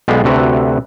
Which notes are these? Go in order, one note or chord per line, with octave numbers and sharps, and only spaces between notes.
B1 G#3 B3 D5 F5 G5
D2 C3 F#4 A4 B4 F#5